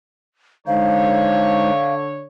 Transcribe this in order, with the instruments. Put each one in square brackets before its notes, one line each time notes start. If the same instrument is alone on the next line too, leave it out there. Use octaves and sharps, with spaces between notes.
[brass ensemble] D3 C#5 [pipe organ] G#3 D#4 C5 [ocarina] F5